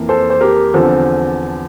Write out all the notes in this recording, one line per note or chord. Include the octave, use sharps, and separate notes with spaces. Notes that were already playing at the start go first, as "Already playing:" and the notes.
Already playing: F2 E3 A#3
A4 C5
C5
G4 A#4
E2 D3 F3 C4 A4